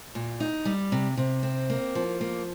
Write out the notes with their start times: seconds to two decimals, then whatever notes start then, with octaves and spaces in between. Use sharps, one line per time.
0.15 A#2
0.40 D#4
0.65 G3
0.92 C3
1.17 C3
1.43 C4
1.70 A#3
1.95 F3
2.21 A#3